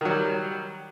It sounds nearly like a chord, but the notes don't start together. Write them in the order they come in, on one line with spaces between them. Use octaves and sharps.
D#3 F#3 G3